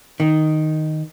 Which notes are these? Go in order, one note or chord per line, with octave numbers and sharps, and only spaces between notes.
D#3